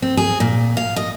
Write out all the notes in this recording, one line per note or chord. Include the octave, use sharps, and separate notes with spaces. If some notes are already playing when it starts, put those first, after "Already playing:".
C4
G#4
A#2
F5
D#5